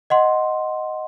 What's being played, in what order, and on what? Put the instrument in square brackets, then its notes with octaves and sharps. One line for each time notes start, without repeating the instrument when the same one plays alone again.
[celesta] D#5 F#5 C6